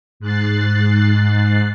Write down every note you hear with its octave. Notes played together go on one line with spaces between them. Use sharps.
G#2 F#6 A6 C7